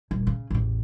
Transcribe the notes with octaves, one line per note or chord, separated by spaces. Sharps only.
D#1
C#3
A1 E2